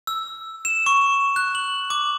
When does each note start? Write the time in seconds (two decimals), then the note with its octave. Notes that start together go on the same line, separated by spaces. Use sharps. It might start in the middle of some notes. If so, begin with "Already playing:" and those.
0.07 E6
0.65 E7
0.86 C#6
1.36 F#6
1.55 F#7
1.90 D6